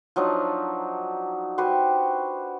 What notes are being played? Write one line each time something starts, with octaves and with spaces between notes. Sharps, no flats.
F3 F#3 D4 D#4
F#4 G4 B4 C5